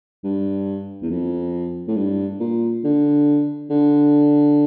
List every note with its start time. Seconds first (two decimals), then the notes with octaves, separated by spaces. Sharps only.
0.24 G2
1.02 E2
1.10 F2
1.88 A2
1.96 G2
2.40 A#2
2.84 D3
3.70 D3